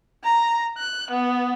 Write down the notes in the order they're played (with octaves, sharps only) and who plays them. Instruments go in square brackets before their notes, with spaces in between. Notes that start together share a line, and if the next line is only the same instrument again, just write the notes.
[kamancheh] A#5
F#6
B3